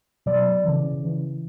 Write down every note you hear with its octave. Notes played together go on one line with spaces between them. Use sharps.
B2 F#3 D5
C#3 E3
C#3 E3